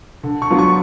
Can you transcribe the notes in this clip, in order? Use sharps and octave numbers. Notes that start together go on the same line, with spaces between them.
D3
C#6
F#3 B3 D4 F4
C#6